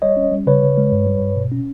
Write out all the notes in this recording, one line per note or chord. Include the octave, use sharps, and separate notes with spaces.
G3 C#5 D#5
C#4
G3
C#3 B4 C#5
C#3
G#3
G2
G3
G2
B2
C#4